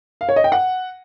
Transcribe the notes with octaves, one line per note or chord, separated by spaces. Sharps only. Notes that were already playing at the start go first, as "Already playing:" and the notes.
F5
C#5
D#5
G5
F#5